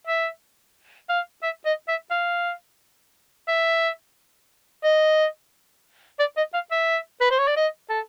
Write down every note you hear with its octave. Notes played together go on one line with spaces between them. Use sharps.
E5
F5
E5
D#5
E5
F5
E5
D#5
D5
D#5
F5
E5
B4
C5
C#5
D5
D#5
A4